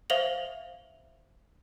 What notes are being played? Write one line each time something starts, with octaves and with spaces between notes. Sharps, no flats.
C5 E5 F5 F7 F#7